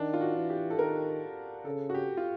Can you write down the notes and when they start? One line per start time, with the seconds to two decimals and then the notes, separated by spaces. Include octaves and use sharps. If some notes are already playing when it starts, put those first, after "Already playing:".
Already playing: D#3 D4
0.13 F4
0.21 F#4
0.36 E3
0.50 G4
0.70 A4
0.78 D#3 A#4
1.65 C#3 A4
1.89 F#4
1.94 G4
2.17 F4